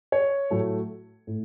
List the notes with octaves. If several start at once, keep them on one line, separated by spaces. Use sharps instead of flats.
C#5
A2 F#3 A3
A2